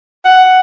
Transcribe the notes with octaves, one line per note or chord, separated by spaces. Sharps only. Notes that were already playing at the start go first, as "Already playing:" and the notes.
F#5